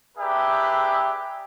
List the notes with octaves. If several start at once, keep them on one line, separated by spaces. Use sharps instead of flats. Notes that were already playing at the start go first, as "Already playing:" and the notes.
D4 G4 G#4 A#4 B4 E5